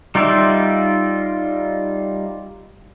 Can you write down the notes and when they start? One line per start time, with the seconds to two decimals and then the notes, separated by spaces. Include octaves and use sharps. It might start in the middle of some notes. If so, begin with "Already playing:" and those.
0.15 G3 D#4 F4 D5 E5